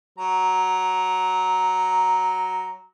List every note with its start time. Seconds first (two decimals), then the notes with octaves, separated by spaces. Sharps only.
0.18 F#3 A#5